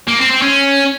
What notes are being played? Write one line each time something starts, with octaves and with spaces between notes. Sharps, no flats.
A#3
C4
C4
C#4